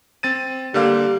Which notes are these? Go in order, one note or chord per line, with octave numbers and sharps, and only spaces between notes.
C4 A6 D#7
D3 G3 A#3 F5